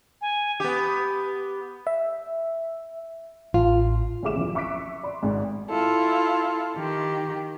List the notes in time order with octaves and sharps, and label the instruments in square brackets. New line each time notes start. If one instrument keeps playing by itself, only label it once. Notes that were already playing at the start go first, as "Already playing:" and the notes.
[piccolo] G#5
[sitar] B3 G4
[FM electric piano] E5
[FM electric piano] A1 [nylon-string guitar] F4
[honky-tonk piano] D#2 A2 G#4 E5 D6 E7
F#1 E2 F3
E5 C#6 D6 F#6 B6 D7
D5 B5 C6
G#1 G#2
[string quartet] E4 F4 A4
D#3 G4